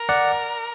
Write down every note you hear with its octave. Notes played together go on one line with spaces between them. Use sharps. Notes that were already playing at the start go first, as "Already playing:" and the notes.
Already playing: A#4
D5 F#5